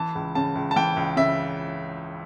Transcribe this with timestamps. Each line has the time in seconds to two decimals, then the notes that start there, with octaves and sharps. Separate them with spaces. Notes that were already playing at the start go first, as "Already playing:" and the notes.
Already playing: E3 A5
0.15 C#2
0.35 C#3 A5
0.55 C#2
0.71 A5
0.76 E3 G5
0.97 C#2
1.17 C#3 E5